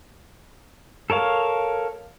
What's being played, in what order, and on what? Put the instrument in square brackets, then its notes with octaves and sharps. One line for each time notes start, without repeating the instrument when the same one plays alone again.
[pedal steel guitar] A4 A#4 C#5 F5